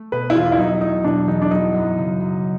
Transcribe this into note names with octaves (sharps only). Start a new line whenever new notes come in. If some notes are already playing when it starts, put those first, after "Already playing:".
Already playing: A3
B2 B4
E4
E2 F4
E4
F#3 D#4
A3 D#4
B2 D4
E2 D#4
D4
F#3 D#4
F#2
C#3
F#2